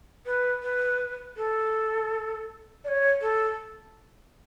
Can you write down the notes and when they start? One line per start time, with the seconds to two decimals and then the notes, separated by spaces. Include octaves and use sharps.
0.26 B4
0.62 B4
1.37 A4
2.84 D5
2.88 C#5
3.21 A4